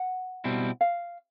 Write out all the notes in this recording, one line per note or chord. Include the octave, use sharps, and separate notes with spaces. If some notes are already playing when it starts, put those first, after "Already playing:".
Already playing: F#5
B2 G3 C4 E4
F5